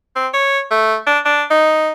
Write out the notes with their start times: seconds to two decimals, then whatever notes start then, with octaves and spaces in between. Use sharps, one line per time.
0.16 C4
0.34 C#5
0.71 A3
1.07 D4
1.25 D4
1.51 D#4